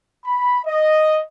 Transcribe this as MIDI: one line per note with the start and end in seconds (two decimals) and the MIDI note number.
0.24 0.60 83
0.65 1.22 75